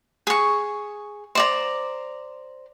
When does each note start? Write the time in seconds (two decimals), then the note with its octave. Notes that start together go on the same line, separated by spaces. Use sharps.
0.27 G#4 C#6
1.35 C5 D5 A#5